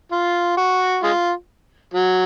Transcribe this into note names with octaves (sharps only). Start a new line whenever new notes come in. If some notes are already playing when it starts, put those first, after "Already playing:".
F4
F#4
G#3 F4
F#3